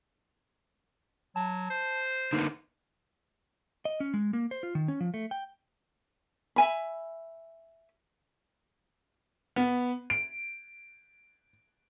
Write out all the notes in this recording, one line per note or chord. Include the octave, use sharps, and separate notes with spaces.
F#3 A5
C5
D3 A#3 B3 D#4
D#5
C#4
G#3
A#3
C5
F4
D#3
C#4
F3
A3
G5
E5 G#5 B5
B3
D7